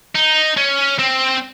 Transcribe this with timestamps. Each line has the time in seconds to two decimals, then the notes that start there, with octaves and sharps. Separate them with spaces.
0.15 D#4
0.57 C#4
0.99 C4